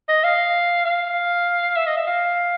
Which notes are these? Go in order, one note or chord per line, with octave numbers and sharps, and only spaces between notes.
D#5
F5
F5
E5
D#5
E5
F5